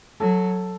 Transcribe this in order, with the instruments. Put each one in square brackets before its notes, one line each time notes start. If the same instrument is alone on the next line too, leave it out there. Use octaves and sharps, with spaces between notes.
[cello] F#3 [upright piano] A4